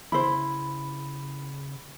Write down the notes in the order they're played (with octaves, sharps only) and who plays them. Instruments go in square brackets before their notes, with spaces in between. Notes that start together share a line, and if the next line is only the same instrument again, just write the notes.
[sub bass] C#3 [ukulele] E4 C5 [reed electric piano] B5